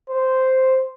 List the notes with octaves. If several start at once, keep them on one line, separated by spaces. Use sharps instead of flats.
C5